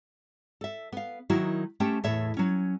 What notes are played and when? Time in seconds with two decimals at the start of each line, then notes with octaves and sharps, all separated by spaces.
0.61 A4 E5
0.93 B3 F5
1.30 D#3 F#3 D#4 E4 F#4 A#4
1.80 A3 C#4 G4 C5 G5 A5
2.04 E2 A2 A4 C#5 E5
2.37 F#3 C#4